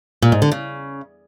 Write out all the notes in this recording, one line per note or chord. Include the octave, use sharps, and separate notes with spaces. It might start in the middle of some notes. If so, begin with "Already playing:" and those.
A#2
G#2
D3
C#3